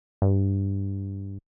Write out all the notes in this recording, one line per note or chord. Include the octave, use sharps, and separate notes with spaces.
G2